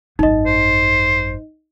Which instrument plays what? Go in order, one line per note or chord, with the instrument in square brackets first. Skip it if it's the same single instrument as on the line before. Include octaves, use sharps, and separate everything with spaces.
[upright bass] G#1 F#2 [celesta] D#4 D#5
[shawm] C5